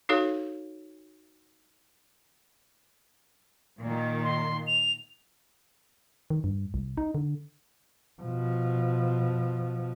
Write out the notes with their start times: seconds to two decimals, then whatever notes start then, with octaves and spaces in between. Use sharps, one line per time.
0.09 D#4 F#4 A4 C#5 F5
3.81 A#2 D#3
4.23 C6
4.67 F7
6.30 D#3
6.44 G2
6.74 C2
6.97 D#4
7.15 D3
8.21 B2 F3